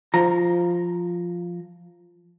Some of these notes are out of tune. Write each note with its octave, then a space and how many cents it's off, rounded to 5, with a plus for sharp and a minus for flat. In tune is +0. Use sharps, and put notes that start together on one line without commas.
F3 +0 A#5 +0